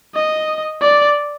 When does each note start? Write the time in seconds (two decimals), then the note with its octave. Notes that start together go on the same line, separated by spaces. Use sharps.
0.14 D#5
0.81 D5